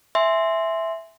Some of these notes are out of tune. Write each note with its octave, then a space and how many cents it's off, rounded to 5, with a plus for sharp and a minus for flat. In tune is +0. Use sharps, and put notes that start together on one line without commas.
E5 +0 G#5 +0 C6 +0